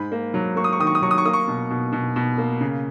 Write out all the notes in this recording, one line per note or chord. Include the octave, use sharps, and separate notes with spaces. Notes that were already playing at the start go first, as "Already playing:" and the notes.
Already playing: G#2 B5
A#3
F#3
A#3 C#6
D#6
C#6
D#3 D#6
C#6
D#6
F#3 C#6
D#6
C#6
A#3 D#6
C#6
B2
B2
B2
B2
A#3
C#3